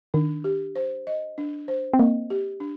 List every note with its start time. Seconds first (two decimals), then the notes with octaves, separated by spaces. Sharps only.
0.14 D#3 D4
0.44 G4
0.75 C5
1.07 D#5
1.38 D4
1.68 C5
1.94 C4
1.99 A#3 D#5
2.30 G4
2.60 D4